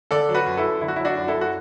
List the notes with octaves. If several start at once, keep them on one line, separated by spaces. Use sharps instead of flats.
D3 A4 D5
F#3
F#4 B4
F#2
E4 A4
F#2
D3 E4
F#4
F#3 E4
D4 F#4
F#2
E4 A4
F#2
F#4